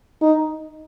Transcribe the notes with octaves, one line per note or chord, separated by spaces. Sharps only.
D#4